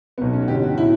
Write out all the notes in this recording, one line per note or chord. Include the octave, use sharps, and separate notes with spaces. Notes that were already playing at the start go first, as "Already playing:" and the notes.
B1 B2 B3
C#4
F#4
A1 G2 D3 G4
F#4
A2 E4